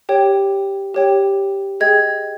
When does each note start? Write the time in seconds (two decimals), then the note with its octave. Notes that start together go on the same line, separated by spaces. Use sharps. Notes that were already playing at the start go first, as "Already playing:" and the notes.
0.09 G4 C#5 G5
0.94 G4 C#5 G5
1.80 G#4 D#5 G5 G#6